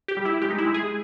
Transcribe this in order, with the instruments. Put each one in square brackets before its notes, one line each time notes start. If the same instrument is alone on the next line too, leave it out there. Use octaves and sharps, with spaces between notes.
[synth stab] G4
G3
E4
G#3 G4
D#4
E4
G#3
G#4